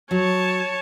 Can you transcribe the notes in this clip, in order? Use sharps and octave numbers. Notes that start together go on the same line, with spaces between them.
F#3 C#5 A5